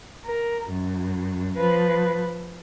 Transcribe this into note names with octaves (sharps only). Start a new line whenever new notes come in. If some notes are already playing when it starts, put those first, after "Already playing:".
A#4
F#2
F3 B4